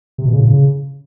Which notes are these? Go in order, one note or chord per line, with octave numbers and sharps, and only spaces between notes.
C3
B2
C#3
A2
C#3